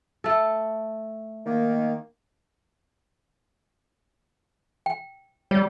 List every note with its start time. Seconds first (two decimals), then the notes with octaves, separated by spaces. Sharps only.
0.24 A3 A4
1.46 D#3 A#3
4.86 G5
5.51 G3 C#5